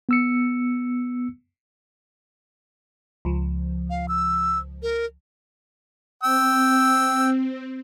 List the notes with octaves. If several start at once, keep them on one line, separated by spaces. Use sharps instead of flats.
B3 E6 C#7
C#2 F3
F5
E6
A#4
C4 G5 E6